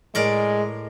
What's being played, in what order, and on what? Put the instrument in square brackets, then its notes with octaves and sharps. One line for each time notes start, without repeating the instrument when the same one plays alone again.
[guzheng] A2 A#4 D5 [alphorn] G#3